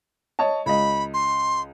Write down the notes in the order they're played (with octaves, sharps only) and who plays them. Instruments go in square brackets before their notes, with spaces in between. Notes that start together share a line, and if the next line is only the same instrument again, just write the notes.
[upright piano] C#5 D#5 A5
[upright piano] C#2 D#5 [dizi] B5
[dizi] C6